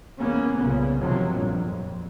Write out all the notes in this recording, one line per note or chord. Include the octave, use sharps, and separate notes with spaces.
E2 A#3 B3 C#4
C2 A#2 C#3 B3
G2 C3 D#3 F3 F#3
A#1 G2
F2